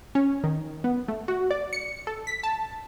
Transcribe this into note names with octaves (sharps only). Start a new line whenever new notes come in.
C#4
D#3
B3
A3
F#4
D5
C#7
A4
B6
A5